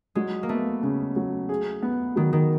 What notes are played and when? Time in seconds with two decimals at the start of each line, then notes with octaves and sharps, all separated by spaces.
0.15 F#3 G#3
0.43 A#3
0.49 A3 B3
0.83 C#3
1.16 F#3
1.49 G#4
1.82 B3
2.16 D#3 F#3
2.33 D#3